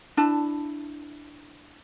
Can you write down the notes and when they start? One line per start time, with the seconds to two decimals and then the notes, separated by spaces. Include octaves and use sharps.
0.17 D4 E4 A5